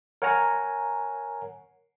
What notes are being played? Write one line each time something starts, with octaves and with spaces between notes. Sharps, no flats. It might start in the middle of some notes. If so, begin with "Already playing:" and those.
A#4 C#5 F#5 G#5 A#5